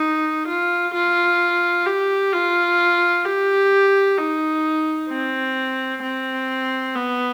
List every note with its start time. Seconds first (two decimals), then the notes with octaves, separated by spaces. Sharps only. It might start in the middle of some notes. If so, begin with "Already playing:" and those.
Already playing: D#4
0.48 F4
0.94 F4
1.86 G4
2.33 F4
3.25 G4
4.18 D#4
5.10 C4
6.03 C4
6.96 B3